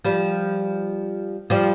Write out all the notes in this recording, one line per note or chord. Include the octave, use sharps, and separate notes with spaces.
F3 G3
F3 G3